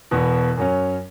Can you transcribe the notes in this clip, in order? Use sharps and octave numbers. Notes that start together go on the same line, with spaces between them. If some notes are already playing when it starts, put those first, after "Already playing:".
E1 E2 B2 B3
F#2 F#3 C#4